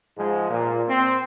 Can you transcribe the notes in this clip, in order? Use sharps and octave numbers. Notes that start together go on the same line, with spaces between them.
G#2 F3 G#3
A#2
C4